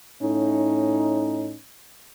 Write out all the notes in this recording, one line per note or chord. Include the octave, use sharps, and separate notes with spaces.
A2 C#4 D#4